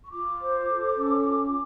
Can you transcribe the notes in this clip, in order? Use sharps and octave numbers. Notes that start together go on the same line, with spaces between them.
C#6
F4 D6
C5
A4
C#4
F4